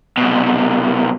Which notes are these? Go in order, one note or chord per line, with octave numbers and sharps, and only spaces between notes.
C2 B2